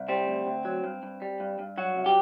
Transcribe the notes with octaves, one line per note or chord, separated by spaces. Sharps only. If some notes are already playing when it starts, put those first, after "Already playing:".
Already playing: C2
G3 C4
D2
D2
F#3
G2
G2
G3
G2
G2
F#3 F#4
C2
G4